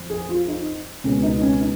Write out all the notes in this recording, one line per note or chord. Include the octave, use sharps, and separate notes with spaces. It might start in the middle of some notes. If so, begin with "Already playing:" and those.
Already playing: F2
G#4
F4
D#4
C#2 B2 G#3 B3 C#4
D#4
C#4
D#4